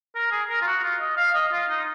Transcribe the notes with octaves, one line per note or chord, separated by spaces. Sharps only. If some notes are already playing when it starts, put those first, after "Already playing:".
A#4
G#4
A#4
F4
F#4
F4
D#5
F5
F5
D#5
F4
D#4